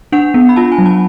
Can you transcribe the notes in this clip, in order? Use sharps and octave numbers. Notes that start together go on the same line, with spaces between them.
D4 F#5
B3
B5
F4 A5
G#5
F#3
A5